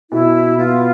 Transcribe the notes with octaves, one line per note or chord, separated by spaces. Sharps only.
B2 E4
B3 F4